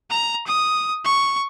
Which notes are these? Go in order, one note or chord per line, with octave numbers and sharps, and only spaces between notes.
A#5
D#6
C#6